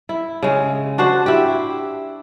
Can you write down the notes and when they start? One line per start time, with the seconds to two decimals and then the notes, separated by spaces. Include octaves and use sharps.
0.09 E4
0.43 C#3 G#3
0.98 D4 F#4 C5
1.26 E4 G4